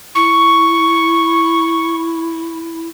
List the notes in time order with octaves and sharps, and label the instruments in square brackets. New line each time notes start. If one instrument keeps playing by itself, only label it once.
[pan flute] E4 [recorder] C#6